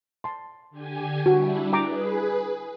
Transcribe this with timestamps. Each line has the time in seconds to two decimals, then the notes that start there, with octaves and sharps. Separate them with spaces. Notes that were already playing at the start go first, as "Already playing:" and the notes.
0.24 A5 C6
0.70 D3 G4 G#5
1.26 G3 D4 E4 F#4
1.73 G#4 B4 G5 A#5 D6